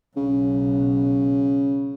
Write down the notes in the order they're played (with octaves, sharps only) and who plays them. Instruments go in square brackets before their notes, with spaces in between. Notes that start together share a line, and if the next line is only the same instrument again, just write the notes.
[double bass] B1 [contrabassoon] C#3